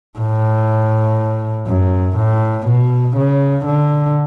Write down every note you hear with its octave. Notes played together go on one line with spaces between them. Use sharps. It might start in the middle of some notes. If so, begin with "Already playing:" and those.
A2
F#2
A2
B2
C#3
D3